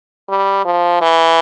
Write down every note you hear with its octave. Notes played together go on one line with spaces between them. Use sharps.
G3
F3
E3